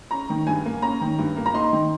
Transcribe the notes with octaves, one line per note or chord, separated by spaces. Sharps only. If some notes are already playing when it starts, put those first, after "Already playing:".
C#4 A#5
D#3
G2 G#5
A#3
C#4 A#5
D#3
G2
A#3
A#5
D#4 C6
D#3